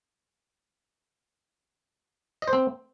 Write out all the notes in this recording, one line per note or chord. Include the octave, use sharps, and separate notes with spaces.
D#5
C5
C4